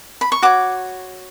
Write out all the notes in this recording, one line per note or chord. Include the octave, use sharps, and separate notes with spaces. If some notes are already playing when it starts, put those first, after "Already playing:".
B5
C#6
F#4 C#5 D6